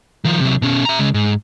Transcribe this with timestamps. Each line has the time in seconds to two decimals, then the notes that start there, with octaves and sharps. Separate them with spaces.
0.25 D#3 F3
0.41 C3 F#3
0.62 B2 C#4
0.85 E5 A#5
0.99 C#3 G#3
1.14 G#2